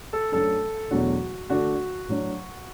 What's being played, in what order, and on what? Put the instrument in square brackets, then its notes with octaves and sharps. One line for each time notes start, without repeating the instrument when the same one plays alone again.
[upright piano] A4
F#2 F#3 A3 D4 A4
E2 B2 F#3 A3 D4 F#4
D3 A3 D4 F#4
A2 F#3 D4